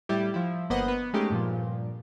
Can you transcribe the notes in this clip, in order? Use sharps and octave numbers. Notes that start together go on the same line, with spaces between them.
A2 G3 E4 G4
F3 E4
G1 A#3 B3 C5 D#5 F#5
B3
G#3 A3 C#4 D#4 G4
G2 A#2 F3